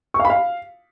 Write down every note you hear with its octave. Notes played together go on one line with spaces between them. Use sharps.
C#6
F5
B5
F5